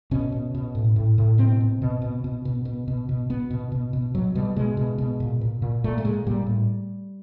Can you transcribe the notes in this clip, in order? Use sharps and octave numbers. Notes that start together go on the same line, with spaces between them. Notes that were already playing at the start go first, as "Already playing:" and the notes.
B2 C#4
B2
B2
A2
A2
A2
B2 C4
B2
B2
B2
B2
B2
B2
B2
B2
B2 B3
B2
B2
B2
B2 F#3
B2 G3
B2 G#3
B2
B2
A#2
A#2
A#2
A#2 A3
A3
A#2 G#3
A#2 G3
A2